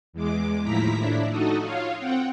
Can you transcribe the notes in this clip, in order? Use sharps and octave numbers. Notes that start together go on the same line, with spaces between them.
E2 G#3 D6
D#2 A2 F3 E4 A#5 B6
A2 D4 E4
D#4 F#4 A4 D#5
F4 C#5 F5
C4 F#5 G5